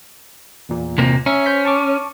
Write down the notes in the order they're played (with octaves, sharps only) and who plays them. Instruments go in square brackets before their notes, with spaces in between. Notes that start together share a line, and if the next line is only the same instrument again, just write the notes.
[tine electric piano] E2 A#2
[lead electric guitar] C3 A#3
[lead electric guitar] C#4 [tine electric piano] E5 A#5
[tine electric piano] C5 G6 B6
A5 C#6 D6